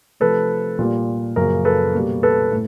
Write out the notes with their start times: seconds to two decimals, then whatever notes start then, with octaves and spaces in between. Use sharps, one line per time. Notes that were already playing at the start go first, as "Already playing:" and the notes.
0.20 C3 F3 A3 A4 B4
0.79 A#2 G3 A#3
1.36 F#2 C#3 F3 A#3 A#4
1.65 A4 B4
1.94 B2 G3 A#3
2.23 A4 B4
2.52 A2